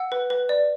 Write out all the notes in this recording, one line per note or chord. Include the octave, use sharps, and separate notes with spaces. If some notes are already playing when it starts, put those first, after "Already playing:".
Already playing: F#5 E6
B4
B4
D5